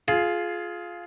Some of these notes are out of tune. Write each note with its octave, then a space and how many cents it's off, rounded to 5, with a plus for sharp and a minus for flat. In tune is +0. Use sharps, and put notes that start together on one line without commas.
F4 +0 G#4 +25